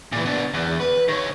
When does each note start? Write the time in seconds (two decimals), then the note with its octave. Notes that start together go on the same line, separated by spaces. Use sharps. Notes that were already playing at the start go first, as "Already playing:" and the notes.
0.12 A#2 E3
0.26 B3 D4
0.54 E2
0.80 B4
1.08 D#3 C#5